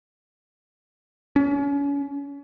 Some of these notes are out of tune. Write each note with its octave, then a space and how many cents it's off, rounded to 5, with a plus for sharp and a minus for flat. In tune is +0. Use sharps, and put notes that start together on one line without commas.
C#4 +35